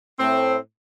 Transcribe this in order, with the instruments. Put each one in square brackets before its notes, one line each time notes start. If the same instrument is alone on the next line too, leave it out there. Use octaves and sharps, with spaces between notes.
[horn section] A2 A3 C4